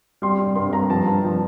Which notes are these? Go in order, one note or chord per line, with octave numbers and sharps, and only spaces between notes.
G3 C6
G3 C6
G2 C6
G2 A#5
F3 A5
G2
F3